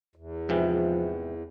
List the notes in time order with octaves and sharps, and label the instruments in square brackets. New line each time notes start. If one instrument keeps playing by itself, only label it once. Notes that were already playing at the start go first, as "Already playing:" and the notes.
[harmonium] E2
[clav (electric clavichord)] G#2 C3 E3 [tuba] F3